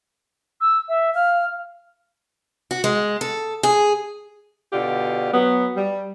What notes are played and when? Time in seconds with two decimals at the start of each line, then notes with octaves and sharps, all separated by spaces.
0.61 E6
0.89 E5
1.15 F5 F6
2.71 F#4
2.84 G#3
3.21 A4
3.63 G#4
4.72 B2 D3 F4 G4
5.33 F#3 B3
5.75 G3